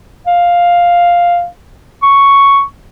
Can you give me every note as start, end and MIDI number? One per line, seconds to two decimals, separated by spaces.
0.27 1.47 77
2.03 2.62 85